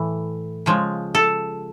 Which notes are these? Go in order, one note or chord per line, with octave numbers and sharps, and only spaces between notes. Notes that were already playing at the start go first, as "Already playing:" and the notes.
Already playing: A2 E3
C#3 F3 G#3
A4